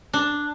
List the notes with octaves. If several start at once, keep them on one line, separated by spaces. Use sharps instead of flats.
D4